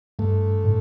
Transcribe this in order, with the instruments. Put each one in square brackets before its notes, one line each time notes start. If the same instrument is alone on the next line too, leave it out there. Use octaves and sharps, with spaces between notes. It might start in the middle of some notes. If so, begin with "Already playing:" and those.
[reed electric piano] G2 [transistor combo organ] A3
[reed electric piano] A2